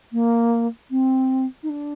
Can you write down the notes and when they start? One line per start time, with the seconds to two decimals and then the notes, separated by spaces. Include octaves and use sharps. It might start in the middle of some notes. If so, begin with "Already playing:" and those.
0.12 A#3
0.90 C4
1.63 D#4
1.69 D4